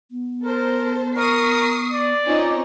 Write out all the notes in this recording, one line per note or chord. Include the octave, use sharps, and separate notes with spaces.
B3
A4 A#4 C5
A#4 C#6 D#6 C7
D5
C4 C#4 D#4 F4